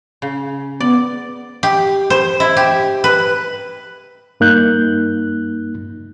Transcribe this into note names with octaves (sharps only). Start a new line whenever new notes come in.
C#3
B3 D5
G4
C5
E4
G4
B4
G2 A#3 D#4 F#6 G6